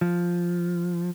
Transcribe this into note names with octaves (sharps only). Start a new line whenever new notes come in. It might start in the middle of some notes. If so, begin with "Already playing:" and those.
F3